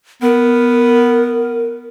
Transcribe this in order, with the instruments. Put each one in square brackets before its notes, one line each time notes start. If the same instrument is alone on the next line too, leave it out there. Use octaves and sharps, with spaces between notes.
[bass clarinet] B3 [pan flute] A#4